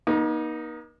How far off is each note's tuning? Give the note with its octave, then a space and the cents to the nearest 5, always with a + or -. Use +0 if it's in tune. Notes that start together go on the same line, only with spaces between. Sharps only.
A#3 +45 D#4 +0